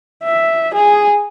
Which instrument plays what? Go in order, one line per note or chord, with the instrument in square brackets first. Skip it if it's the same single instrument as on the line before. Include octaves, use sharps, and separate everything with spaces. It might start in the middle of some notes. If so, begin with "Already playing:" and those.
[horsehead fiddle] E5
G#4